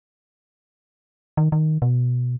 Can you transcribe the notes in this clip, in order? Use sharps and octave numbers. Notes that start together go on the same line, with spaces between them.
D#3
D#3
B2